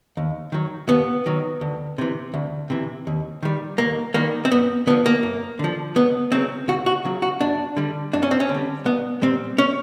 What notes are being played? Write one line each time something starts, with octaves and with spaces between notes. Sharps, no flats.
D#2
D#3 F#3
D#2 B3
D#3 F#3
D2
C3 E3
D2
C3 E3
D#2
D#3 G3
D#2 A#3
D#3 G3 A#3
C4
F#2 B3
D3 F3 B3
A#3
F#2
D3 F3
C#2 B3
C#3 F#3 C4
C#2 F#4
F#4
C#3 F#3
F#4
F#2 D4
D3 G3
F#2 D4
C#4
C4
C#4
D3
G3
C2 B3
A#2 G3 C4
C#4